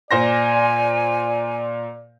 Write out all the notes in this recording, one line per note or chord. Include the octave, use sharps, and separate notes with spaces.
A#2 C5 D5 G#5 A#6